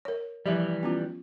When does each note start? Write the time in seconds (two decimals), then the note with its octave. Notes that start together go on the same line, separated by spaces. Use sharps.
0.05 A#4 C#5
0.46 E3 F3 G3 G4 E5
0.83 B3 C#4 F4